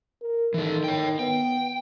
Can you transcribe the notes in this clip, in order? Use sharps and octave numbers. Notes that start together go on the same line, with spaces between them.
A#4
D#3 E3 A4
C#5 G5
B3 G5